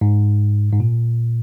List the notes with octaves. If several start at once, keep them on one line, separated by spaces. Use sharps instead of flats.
G#2
G#2
A#2